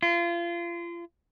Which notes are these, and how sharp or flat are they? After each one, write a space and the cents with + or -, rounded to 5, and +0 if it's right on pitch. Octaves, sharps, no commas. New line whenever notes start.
F4 -30